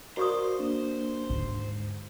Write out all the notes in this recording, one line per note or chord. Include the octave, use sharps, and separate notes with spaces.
F#4 A#4 C5 D5 F5 C#6 D#6
A#3 D4
D#2 G#2 D3